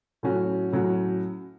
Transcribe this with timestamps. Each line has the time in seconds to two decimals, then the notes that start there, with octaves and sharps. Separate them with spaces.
0.23 A2 F#3 C#4 F#4
0.72 A2 F#3 C#4 F#4